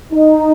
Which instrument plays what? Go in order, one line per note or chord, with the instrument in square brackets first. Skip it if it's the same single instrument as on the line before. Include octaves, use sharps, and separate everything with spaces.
[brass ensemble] D#4